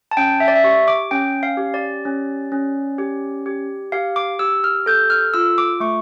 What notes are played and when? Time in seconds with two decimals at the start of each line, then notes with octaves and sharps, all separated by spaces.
0.11 A5
0.17 C#4 G5
0.40 E5
0.48 D5
0.55 E5
0.64 G4 C#6
0.88 D6
1.11 C#4 G5
1.43 F5
1.57 G4
1.74 D5
2.05 C#4
2.52 C#4
2.98 G4
3.46 G4
3.92 G4 F5
4.16 D6
4.39 G4 E6
4.64 F6
4.86 A4 G6
5.10 F6
5.34 F4 E6
5.58 D6
5.80 A3 C#6